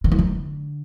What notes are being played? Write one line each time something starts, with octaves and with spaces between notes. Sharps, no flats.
D3
E3
D3